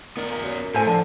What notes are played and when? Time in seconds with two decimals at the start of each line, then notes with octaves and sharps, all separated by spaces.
0.17 D#3 B3 D5
0.30 A#2
0.44 F#2
0.74 A2 A4 C5 G#5
0.87 D3 F3 A5